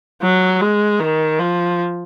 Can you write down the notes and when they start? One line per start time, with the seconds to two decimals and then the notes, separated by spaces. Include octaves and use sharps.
0.22 F#3
0.61 G#3
1.00 D#3
1.40 F3